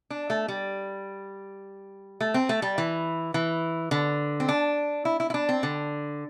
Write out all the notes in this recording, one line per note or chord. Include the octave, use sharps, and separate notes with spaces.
D4
A3
G3
A3
C4
A3
G3
E3
E3
D3
C4
D4
E4
E4
E4
D4
C4
D3